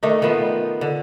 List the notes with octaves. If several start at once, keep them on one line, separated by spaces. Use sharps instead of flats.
D#3 A3 D4 D#4
D#3 F3 B3
D3